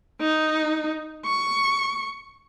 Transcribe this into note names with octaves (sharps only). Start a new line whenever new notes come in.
D#4
C#6